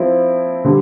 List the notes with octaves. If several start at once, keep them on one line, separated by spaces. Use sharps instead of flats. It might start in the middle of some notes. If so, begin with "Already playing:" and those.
Already playing: F3 C4 E4
D3 G3